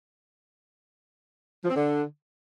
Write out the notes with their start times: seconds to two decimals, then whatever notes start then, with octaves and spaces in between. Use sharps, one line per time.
1.64 F3
1.70 C4
1.76 D3